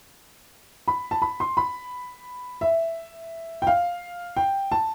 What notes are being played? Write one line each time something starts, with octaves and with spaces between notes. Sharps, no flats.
B5
A5
B5
C6
B5
E5
G5
F5
G5
A5